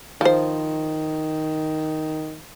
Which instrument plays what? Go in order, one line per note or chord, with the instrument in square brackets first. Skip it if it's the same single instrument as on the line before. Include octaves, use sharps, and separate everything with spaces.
[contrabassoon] D#3 [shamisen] F3 C5